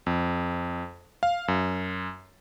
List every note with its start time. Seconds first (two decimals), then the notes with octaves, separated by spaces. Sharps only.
0.06 F2
1.23 F5
1.48 F#2